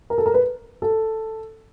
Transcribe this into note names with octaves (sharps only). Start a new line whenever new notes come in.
A#4
A4
A#4
B4
A4